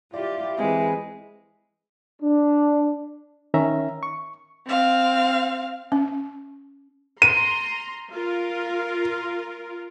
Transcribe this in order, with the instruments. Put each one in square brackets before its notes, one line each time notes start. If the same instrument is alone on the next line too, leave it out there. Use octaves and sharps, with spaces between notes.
[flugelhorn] E4 [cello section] F4 G4 [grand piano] D5
[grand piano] E3 C4 [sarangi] G#3 [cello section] B4
[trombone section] D4
[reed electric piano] D#3 C#4 E5 A#5
C#6
[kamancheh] C4 F5
[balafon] C#4
[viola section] A#5 C6 [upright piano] D#7
[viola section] F4 A#4